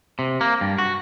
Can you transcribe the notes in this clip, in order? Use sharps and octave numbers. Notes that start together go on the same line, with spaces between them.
C3
A#3
G2
F#4